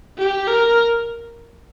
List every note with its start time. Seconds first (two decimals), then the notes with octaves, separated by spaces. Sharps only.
0.19 G4
0.48 A#4